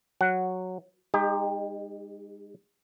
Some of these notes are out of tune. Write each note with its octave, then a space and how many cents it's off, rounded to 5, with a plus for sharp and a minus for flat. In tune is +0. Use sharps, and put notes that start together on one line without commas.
F#3 -5 F#5 +0
G#3 -35 D#4 -15 G4 +25